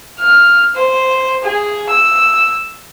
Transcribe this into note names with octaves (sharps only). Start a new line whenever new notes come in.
F6
C5
G#4
E6